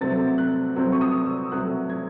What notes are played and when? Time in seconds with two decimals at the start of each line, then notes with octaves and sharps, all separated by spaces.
0.01 C3 F#3 A3 C4 A6
0.38 F#6
0.76 C3 F#3 A3 C4 E6
0.92 C#6
1.01 D#6
1.26 E6
1.52 C3 F#3 A3 C4 F#6
1.90 G#6